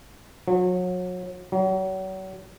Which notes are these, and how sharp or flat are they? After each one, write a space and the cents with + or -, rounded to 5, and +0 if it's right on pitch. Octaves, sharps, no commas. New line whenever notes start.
F#3 -35
F#3 +35